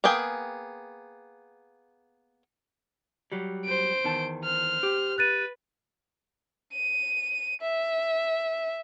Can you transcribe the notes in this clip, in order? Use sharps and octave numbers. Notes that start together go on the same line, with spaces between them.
A#3 B3 G#4 G5
F#3 G3
C5 D7
E2 D#3 A5
C5 F6
G4
B4 F#6 A6 D#7
D#7
E5